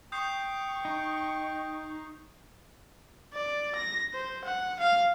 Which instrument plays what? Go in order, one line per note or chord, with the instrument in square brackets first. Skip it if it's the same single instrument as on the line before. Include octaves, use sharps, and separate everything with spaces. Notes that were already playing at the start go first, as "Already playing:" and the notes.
[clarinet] G5 [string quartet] C#6 [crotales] D#6 G6 C7
[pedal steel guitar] D#4
[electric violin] D5
A#6
C5
F#5
F5